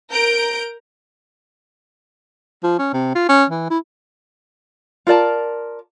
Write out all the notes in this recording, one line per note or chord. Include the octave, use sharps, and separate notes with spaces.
A#4 A#5 G6 D7
F3
C#4
C3
F4
C#4
E3
E4
F4 A#4 D5 A5